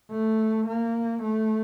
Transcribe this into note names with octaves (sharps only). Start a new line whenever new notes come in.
A3
A#3
A3